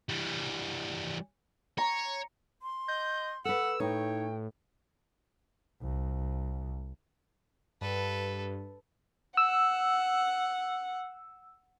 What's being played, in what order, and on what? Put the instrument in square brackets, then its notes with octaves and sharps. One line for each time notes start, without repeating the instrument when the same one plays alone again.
[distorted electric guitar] E3 G3
[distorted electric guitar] C#5 [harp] A#5
[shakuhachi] C6
[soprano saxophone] D#5 [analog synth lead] G6
[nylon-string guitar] A4 B4 [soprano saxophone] F#5 [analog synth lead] E6
[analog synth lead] A2 [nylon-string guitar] D#4 [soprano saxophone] C#5 [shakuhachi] G5
[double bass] C2
[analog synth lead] G2 [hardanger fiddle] A4 B4
[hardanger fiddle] F#5 [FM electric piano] E6